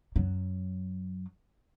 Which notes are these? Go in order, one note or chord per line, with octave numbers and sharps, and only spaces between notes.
F#2 F#3